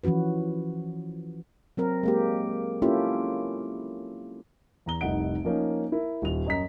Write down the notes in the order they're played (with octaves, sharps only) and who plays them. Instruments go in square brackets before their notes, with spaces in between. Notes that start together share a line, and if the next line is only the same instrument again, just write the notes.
[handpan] E3 F3 C#4 F#4 B4
F#3 C4 A#4
G#3 A#3 G4
A#3 C#4 E4 F4 G4 A4
[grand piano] E2 A#5 G7
F1 C2 D#4 F#5 D7
F3 A#3 C#4 D#4
E4 A#4
D#1 F7
F#2 D#5 A#5 B6